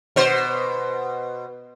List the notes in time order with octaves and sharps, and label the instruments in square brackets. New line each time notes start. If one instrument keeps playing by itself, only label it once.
[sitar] B2 C5